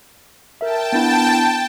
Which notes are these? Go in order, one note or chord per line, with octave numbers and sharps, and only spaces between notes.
A#4 E5 G5 A5
B3 D4 E4